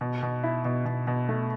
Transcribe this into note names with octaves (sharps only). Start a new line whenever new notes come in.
B2
B2
E4
B2
B2
B2
A3